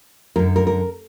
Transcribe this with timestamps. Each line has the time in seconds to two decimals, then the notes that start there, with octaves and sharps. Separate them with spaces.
0.36 F#2 D3 A#4
0.56 A#4
0.67 A#4